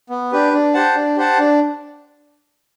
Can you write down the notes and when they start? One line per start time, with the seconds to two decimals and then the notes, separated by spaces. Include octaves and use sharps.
0.10 B3
0.32 D4 G4 B4
0.53 D4
0.74 G4 C5 F#5 A5
0.95 D4
1.16 G4 C5 F#5 A5
1.38 D4